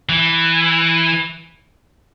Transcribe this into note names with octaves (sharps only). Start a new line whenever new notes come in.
E3